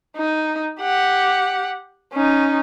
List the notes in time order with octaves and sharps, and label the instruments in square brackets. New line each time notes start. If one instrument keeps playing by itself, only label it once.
[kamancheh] D#4
G4 F#5
C#4 D#4